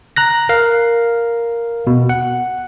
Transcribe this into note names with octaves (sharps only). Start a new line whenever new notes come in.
A#5 F#6 A#6
A#4 F5
B2
F#5